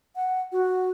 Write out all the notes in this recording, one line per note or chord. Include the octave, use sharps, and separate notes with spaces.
F#5
F#4